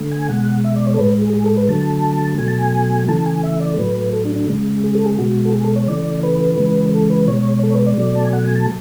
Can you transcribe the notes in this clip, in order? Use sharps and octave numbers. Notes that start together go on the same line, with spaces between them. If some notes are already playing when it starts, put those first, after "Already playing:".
Already playing: D3 A3
G#5
B2 G#3 F#5
E5
D5
C#5
A4
A2 G#3 B4
G#4
G#4
A4
B4
D3 F#3 A3 A5
B2 F#3 A3 G#5
A5
G#5
C#3 E3 A3 A5
G#5
E5
D5
A4
A2 F#3 A3 B4
A4
D4
D4
C#3 G#3
G#4
A4
G#4
B2 G#3 F#4
A4
G#4
A4
C#5
C#3 E3 A3 D5
B4
C#3 E3 G#3
A4
B4
B2 G#3 C#5
A4
C#5
B4
D5
B2 F#3 A3
A5
G#5
F#5
G#5
A5